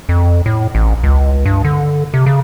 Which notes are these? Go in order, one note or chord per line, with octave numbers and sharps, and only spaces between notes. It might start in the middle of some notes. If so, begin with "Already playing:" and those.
F2
A2
A1
C#2
G2
D3
C3
C#3